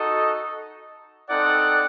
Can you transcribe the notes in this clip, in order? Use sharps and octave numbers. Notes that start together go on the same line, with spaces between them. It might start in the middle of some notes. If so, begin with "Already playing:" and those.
Already playing: D#4 F#4 A4 D#5
C4 D#4 A4 D5 F#5